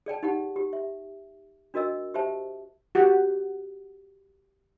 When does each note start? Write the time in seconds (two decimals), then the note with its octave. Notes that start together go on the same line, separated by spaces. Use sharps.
0.06 G#4 D5 G5 A5
0.23 D#4 G4 F#5 A5
0.56 G4
0.73 E5
1.74 D4 F#4 A#4 D#5 E6
2.14 G4 C5 E5 A5
2.95 F#4 G4 F#5